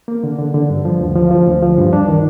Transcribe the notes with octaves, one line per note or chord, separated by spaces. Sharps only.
A#3
D3
D3
D3
G2
F3
D2
F3
F3
D2
F3
G2
D4
D#3